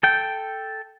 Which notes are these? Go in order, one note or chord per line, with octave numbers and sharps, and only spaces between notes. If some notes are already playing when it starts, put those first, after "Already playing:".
A4 G5